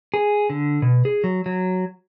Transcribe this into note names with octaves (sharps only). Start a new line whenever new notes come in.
G#4
D3
B2
G#4
F#3
F#3